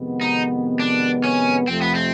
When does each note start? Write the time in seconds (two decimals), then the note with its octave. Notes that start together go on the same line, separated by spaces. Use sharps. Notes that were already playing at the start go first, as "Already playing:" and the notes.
Already playing: F2 C3 D#3 G#3 B3
0.21 D#4
0.80 D4
1.24 C#4
1.67 F2 C3 F3 A3 C4
1.81 B3
1.95 C4